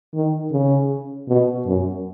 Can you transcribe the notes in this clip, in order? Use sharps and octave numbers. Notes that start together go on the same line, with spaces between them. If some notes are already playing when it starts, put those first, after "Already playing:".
D#3
C#3
B2
F#2